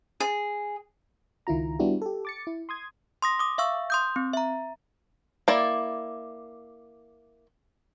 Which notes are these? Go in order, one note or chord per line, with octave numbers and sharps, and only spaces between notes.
G#4
C#2 D#3 E4 F4 A#5
G3 B3 D4 E4 F#4 G4
G4 A4
D6 A6 C#7
E4
C6 D#6 G#6
C6 D#6 A#6
D6 D#6
E5 F5 C#6 E6
C6 D#6 G6
C4
E5 A#5
A#3 E4 D5